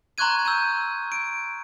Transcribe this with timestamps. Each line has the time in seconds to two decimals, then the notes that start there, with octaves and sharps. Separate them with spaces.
0.18 A#5 C6 C#6 F#6 G#6 D#7
0.45 E6 G6 D#7
1.12 D7